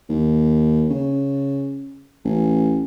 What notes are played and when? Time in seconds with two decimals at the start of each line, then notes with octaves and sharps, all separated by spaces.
0.09 D#2
0.90 C#3
2.25 A1